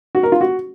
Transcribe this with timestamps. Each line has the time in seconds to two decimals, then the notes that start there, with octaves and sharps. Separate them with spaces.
0.15 F#4
0.23 A#4
0.32 F4
0.41 F#4